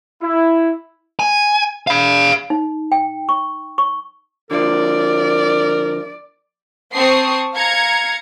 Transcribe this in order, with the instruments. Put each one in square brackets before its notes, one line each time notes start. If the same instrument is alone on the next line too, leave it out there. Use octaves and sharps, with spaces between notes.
[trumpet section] E4
[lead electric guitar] G#5
F5 B5
[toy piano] D#4
G5
C#6
C#6
[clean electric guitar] D3 F3 [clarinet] A#4 [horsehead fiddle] D5
[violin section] C4 A5 C#6 D#6 C7
F5 A#5 G#6 C#7